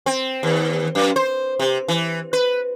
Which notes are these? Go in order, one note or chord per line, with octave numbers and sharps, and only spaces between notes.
C4
D#2
F#2
C5
C3
E3
B4